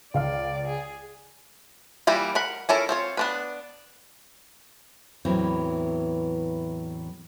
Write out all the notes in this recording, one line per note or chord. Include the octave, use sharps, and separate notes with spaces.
C#2 D5 F5 F6
G#4
E3 G3 A#3 E4
A#4 F#5 B5
C#4 E4 A4 A#4
C4 F4 C#5
B3 D4 B4
E2 A2 E3 F#3 C4